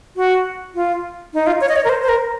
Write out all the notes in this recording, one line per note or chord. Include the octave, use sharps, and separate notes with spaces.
F#4
F4
D#4
F4
C#5
D#5
C#5
A#4
C5
C5
A#4